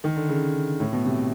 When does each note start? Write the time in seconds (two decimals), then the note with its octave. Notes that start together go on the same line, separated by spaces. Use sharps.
0.04 D#3
0.16 D3
0.29 C#3
0.80 A2
0.93 B2
1.06 C3